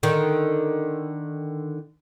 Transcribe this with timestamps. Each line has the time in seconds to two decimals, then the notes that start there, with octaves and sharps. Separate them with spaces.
0.03 D3 D#3